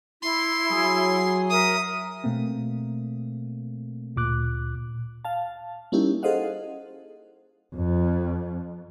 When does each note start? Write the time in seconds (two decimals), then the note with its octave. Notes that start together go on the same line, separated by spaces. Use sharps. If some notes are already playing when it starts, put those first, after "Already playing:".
0.22 E4 C6
0.71 F#3 G#4
1.50 A#4 E5 D#6
2.24 B2 A3 A#3 C4
4.16 D2 A#2 D6 F#6
5.25 F5 A5
5.92 G3 A#3 C#4 D#4 E4 G4
6.23 G#4 A4 C5 D#5 F5 F#5
7.75 F2